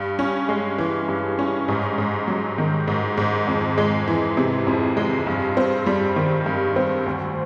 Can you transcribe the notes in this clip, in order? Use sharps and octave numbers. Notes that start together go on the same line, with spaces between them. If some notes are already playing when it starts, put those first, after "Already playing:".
Already playing: G2
C#4
G#3
E3
G2
C#4
G#2
G#2
F#3
D#3
G#2
G#2
F2
G#3
E3
C3
F2
G#3
G2
C4
G3
D#3
G2
C4
D2